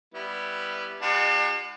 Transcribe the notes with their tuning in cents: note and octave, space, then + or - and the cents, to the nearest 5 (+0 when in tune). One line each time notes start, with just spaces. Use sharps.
G3 +5 B3 +0 E4 +0
G#3 -45 D4 +40 F#4 -30